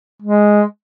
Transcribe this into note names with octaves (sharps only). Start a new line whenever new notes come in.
G#3